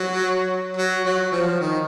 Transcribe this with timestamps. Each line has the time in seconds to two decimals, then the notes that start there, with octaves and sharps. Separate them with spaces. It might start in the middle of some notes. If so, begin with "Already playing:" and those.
Already playing: F#3
0.77 F#3
1.05 F#3
1.32 F3
1.60 D#3